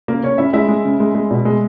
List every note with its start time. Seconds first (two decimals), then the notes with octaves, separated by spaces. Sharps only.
0.08 C#3 A#3 A#4
0.23 C#3 C#4 C#5
0.38 C#3 E4 E5
0.53 G#3 E4 E5
0.68 G#3
0.85 C#3
1.00 G#3
1.15 G#3
1.31 B2
1.45 G#3